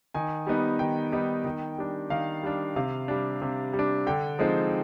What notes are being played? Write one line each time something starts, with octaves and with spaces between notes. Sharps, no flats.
D#3 G#5
G3 B3 D#4
D#3 G5
G3 B3 D#4
D#3
G3 D4
D#3 F5
G3 D4
C3 F5
G3 D4
C3
G3
D4
D3 G5
F3 G#3 C4 D#4